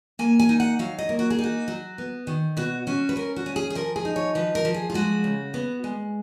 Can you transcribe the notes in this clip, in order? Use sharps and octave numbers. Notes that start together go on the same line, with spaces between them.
A#3 G#5
G#5
D#4
F#5
F#3 F5
D#5
A#3
F#4
G#4
D#4
F#4
F#3
B3
D#3
B2 F#4
C#4 F#4
B4
C#4 A#4
F#4
C#4
G#4
G#4
F3 A#4
G#4
D#4
C#5
F3 B4
A#4
F3
G#4
F4
G#3 F#4
C#3
B3
G#3